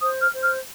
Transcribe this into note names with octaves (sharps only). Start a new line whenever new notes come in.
C5 D#6
F6
C5
F6